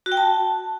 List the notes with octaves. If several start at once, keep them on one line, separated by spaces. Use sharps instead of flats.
F#4
G5
A5